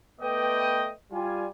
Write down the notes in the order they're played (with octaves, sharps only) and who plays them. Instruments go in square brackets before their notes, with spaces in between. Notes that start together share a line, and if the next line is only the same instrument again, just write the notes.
[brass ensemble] A3 B3 B4 D5 D#5 G5
G3 F4 G#5